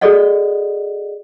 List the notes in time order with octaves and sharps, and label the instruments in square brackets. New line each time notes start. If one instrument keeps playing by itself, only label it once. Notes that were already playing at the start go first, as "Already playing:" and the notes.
[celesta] F#4 G#4 A4 D5 D#5 F#5